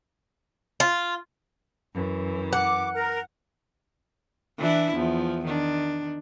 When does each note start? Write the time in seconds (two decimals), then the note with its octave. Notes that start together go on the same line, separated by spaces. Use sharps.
0.80 F4
1.93 F#2 E3
2.53 F#5 D6
2.94 A#4
4.58 E3 D4 E4
4.95 E2 F3
5.45 D#3 D4